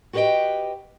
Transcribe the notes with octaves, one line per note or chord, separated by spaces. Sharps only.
F#4 G4 B4 C5 D#5 G5